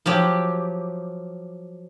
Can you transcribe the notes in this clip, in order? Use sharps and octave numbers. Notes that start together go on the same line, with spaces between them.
F3 F#3 G4